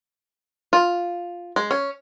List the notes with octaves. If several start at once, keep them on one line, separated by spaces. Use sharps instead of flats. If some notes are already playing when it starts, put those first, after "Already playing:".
F4
G#3
C#4